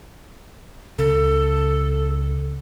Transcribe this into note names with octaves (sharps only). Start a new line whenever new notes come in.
C#2 C#3 A4